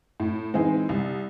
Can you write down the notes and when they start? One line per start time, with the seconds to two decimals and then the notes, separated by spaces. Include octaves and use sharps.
0.20 A2
0.54 E3 G#3 C4 D#4
0.89 C2